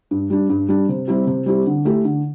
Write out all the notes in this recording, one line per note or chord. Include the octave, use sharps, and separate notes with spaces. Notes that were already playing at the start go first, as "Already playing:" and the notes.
G2
G3 D4
G2
G3 D4
C3
G3 C4 E4 G4
C3
G3 C4 E4 G4
D3
A3 E4 G4
D3